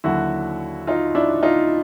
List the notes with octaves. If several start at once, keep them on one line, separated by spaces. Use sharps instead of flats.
D#2 D3 F#3 E4 F#4
D#4 F4
D4 E4
D#4 F4